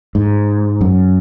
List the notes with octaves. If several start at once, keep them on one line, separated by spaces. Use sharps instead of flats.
G#2
F#2